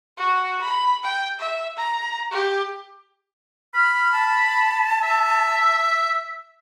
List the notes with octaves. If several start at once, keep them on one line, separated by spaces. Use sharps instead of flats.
F#4
B5
G5
E5
A#5
G4
B5 F6
A5
E5